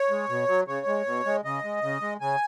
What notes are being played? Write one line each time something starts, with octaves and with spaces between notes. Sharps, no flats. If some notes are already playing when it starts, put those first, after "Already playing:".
Already playing: C#5
G#3
B2
F#3
C#3 C#5
G#3
B2
G#3
C#3 D#5
G#3
C#3
G#3
C#3 G#5